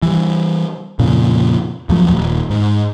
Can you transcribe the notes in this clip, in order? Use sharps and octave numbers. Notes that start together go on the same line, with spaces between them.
E3 G3
F2 A#2 C#3
E2 F3 F#3 A3
D#1
G#2